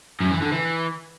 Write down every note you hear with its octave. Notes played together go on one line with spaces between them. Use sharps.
F#2
E3
D3
E3